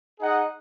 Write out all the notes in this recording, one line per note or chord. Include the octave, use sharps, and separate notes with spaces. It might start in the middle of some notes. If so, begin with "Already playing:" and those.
D#4 G#4 D#5 F#5